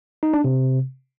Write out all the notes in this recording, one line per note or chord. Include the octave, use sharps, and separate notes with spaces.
D#4
D4
C3